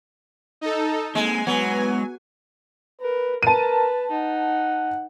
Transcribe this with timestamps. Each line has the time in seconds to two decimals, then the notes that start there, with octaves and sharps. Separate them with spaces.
0.61 D#4 A4
1.15 G#3 A#3 C4 G#5
1.47 F#3 G#3 B3 F#5
3.01 A#4 B4
3.43 A#4 B4 A5 D#7
4.11 D#4 F#5